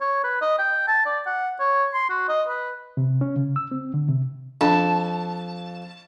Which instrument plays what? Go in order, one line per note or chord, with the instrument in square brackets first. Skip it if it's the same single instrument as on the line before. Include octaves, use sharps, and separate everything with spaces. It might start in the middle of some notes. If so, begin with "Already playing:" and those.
[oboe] C#5
B4
D#5
G5
A5
D5
F#5
C#5
C6
F#4
D#5
B4
[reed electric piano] C3
C#4
C#3
E6
C4
D3
C3
[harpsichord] F2 [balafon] D4 B5 [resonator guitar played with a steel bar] A5